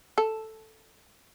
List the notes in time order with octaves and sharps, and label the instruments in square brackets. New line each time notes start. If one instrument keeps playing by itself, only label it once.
[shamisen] A4